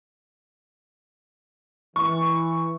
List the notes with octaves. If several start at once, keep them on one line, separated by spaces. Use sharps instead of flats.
E3 C#6